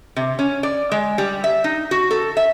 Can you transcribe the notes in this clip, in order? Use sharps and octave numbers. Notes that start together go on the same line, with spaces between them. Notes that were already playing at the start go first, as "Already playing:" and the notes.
C3
C#4
D5
G#3
G3
E5
D#4
F#4
A4
E5